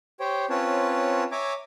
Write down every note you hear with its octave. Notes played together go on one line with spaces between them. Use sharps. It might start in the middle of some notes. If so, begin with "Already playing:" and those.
G4 C5 C#5 G5
C4 C#4 F4 B4 C#5 A5
C#5 E5 G#5 A#5 D6